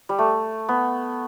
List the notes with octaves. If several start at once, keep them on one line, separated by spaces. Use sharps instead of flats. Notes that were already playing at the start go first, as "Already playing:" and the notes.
G3
A3
B3